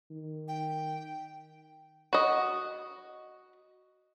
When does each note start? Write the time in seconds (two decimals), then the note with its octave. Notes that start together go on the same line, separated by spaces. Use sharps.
0.11 D#3
0.48 G5
2.13 F#4 D#5